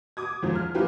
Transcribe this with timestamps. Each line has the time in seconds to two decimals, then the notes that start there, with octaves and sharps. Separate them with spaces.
0.17 D6 D#6 G#6
0.43 E2 G#2 F3
0.56 F6
0.74 E3 F3 A#3 G4 B4